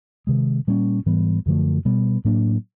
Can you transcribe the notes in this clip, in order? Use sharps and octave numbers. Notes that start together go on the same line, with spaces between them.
C3 D#3 G#3
A#2 G3 A#3 C#4
G#2 E3 G3 B3
F#2 D3 F3 A3
B2 G3 B3
A2 F#3 A#3 D4